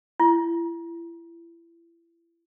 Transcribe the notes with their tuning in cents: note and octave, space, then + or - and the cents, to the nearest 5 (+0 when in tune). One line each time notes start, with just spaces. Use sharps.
E4 +30